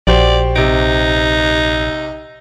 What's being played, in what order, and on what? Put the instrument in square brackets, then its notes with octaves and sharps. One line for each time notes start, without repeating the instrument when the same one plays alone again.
[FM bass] A#1 [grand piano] F#4 G4 C5 [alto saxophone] D5
[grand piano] C3 D7 [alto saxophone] D#4